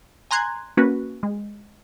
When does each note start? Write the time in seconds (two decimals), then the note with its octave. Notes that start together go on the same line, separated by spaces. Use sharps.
0.31 G#5 A#5 C6 F#6 G#6
0.77 A#3 C#4 F#4 B4
1.23 G#3